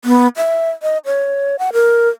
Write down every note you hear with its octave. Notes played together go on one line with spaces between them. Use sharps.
B3
E5
D#5
C#5
F#5
A#4